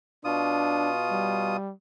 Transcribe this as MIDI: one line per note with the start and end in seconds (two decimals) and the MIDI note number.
0.25 1.57 47
0.25 0.92 62
0.25 1.57 65
0.25 1.57 87
1.11 1.73 55